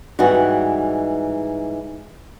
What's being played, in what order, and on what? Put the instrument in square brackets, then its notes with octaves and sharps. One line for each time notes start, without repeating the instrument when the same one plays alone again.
[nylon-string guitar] G#2 E3 G3 D#4 F#4